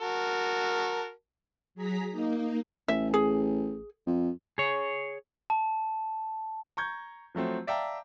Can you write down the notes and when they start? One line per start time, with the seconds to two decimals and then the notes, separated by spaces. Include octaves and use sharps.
0.01 F#4 A#4 A5
1.75 F#3 G#4 A#5 B6
2.10 A#3 D#4
2.88 A1 E5
3.14 G#4
4.07 F2
4.58 G#4 C#5
5.50 A5
6.77 A#5 C#6 G6 G#6
7.35 F3 F#3 A3 C4
7.67 D5 E5 F5 G5 A5 A#5